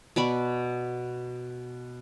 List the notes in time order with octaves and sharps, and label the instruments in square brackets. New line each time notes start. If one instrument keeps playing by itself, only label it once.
[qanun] B2 D5 B5 C#6